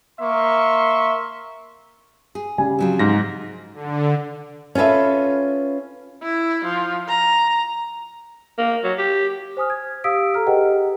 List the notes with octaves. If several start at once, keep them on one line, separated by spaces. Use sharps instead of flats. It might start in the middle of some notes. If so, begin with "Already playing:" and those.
A#3 A#4 E5 C6 C#6
G#4
C#3 G3 G#5
F3 F#3 C4
G#2 A#6
D3
C#4 F4 A4 B4 E5
E4
F3
A#5
A#3
F#3
G4
C5 G#5 D#6 F6
G#6
G4 F5 D#6 E6 B6 D7
A4 A#5 F6
G4 G#4 B4 D#5 F#5 G5